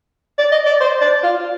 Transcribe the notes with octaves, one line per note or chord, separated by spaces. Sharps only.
D5
D#5
D5
C5
D5
F4